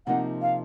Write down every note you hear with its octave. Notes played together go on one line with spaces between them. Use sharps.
C3 F3 A#3 D#4 F#5
F5